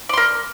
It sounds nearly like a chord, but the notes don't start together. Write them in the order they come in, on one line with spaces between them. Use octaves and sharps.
D5 C6 A#4